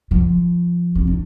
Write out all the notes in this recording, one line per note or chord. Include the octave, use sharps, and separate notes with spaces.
F3
C4
D4